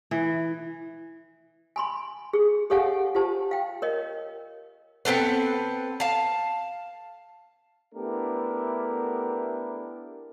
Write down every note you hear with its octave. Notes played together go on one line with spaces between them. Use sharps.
E3
G#5 B5 C6
G#4
G4 A4 C#5 F5 F#5 G#5
F4 G4 C5 A5
F5 G5
A#4 C#5 D#5
B3 C4 A4 B4
F5 A5
A3 B3 D4 E4 G4 A#4